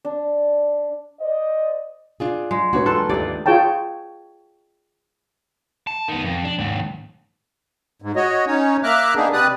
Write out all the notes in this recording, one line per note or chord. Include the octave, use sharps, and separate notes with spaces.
D4
C5 D5 D#5
D4 F4 G#4
G#3
G#1 A#3 D4 F#4 B4 C#5
E1 F4 A4 C6 F#6
G#1 D#2 A3 G4 D5
F4 G#4 C#5 G5 A5
A5
D#3 B3
F2
D4
D#2 G#2
G#2
F#4 C#5 D#5
C#4 D#4 C#5
A#3 E5 A#5 D6 F6 F#6
A#3 B3 D4 D#4 G#4
C3 G4 B4 D5 D#6 F#6